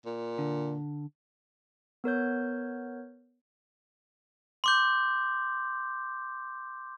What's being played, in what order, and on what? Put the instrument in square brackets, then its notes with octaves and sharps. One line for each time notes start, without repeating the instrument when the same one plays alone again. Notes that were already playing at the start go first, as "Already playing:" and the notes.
[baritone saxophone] A#2
[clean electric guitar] D3
[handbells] B3 A#4 C#5 G6
[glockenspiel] C6 D6 G6